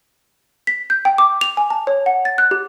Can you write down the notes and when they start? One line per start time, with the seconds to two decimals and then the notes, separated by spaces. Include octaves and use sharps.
0.67 B6
0.90 G6
1.05 G5
1.18 D6
1.41 F7
1.57 G#5
1.70 A5
1.87 C#5
2.06 F#5
2.25 A6
2.38 F#6
2.51 G4